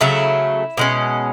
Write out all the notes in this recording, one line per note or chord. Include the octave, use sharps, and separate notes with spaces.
C#3 F#3 A3 E4
B2 G#3 C#4